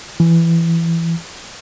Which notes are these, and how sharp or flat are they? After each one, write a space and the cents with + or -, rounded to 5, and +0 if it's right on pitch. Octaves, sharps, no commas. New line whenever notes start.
E3 +15